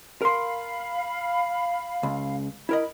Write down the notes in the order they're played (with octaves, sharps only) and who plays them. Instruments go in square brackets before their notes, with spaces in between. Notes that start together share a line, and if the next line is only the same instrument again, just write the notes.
[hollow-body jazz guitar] A#4 C6 [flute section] F5 B5
[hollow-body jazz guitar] C#2
[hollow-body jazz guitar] E4 A#4 D#5 [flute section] B5